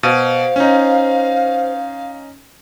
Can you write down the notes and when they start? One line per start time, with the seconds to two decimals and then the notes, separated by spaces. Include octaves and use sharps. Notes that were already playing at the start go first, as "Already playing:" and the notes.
0.03 B2 C5 F5 D#7
0.56 C#4 D#4